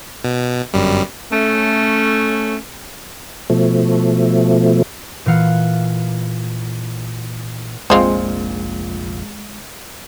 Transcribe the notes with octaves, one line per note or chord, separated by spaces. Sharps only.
B2
G1 F#2 G3
A3 C#4
B2 F3 A3
A#2 E3 F5 F#5
F1 A#1 A#2 G#3 C4 F4 C5